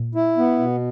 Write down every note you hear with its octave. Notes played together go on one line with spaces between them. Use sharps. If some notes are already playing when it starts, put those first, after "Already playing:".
Already playing: A#2
E4
B3
B2